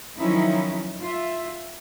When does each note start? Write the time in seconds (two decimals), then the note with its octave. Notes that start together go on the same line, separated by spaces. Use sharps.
0.19 D#3 F3 F#3 C#4 D#4 E4
1.01 F4 E5